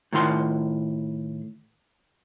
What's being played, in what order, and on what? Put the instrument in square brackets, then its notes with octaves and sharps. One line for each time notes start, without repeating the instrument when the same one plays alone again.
[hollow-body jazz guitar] A2 D#3 F4 C6